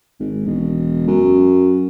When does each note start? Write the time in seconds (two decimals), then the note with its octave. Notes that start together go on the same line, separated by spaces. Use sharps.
0.20 G#1
0.45 E1
1.08 F#2